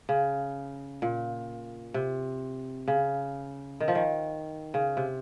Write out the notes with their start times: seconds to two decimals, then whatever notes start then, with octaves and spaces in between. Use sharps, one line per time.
0.09 C#3
1.02 A#2
1.94 C3
2.88 C#3
3.80 D#3
3.88 F3
3.95 D#3
4.74 C#3
4.97 C3